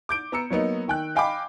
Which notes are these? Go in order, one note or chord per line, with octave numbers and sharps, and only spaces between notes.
D6 G6 D7
B3 A#5 E6 C#7
F#3 A#3 B3 D#4
D#3 G5 F#6
D#5 F5 G5 G#5 B5 D6